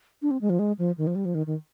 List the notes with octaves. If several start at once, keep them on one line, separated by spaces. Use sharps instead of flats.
D4
C4
G#3
F3
G#3
F3
D#3
F3
G3
F3
D#3
D#3